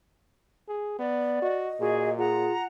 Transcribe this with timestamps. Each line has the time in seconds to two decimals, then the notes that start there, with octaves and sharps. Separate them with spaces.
0.68 G#4
0.99 B3 D5
1.42 F#4 D#5
1.80 A#2 F#4 G#4
2.18 F4 G#4 F#5 A#5